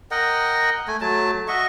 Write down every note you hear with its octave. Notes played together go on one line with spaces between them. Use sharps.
A#4 D#5 F#5 G5
A3 G#5
F#3 A3 A5
F#4 D#5 E5 C#6